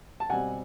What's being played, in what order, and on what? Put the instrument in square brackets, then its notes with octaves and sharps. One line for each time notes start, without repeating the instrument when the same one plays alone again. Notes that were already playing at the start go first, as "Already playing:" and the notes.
[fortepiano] A5
B2 G3 C4 F#5 G#5